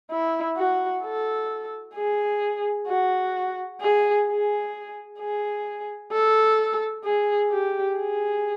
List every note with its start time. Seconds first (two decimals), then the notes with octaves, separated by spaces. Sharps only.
0.11 E4
0.57 F#4
1.03 A4
1.96 G#4
2.88 F#4
3.81 G#4
4.27 G#4
5.19 G#4
6.12 A4
7.04 G#4
7.51 G4
7.97 G#4